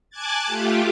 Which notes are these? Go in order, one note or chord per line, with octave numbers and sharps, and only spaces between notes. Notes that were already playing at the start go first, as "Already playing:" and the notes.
G#5 A5 D6 F#6 G#6 A6
A3 F4 G4